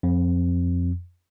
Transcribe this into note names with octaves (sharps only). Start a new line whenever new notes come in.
F2